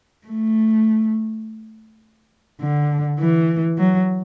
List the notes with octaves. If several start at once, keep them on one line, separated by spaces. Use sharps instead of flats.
A3
D3
E3
F#3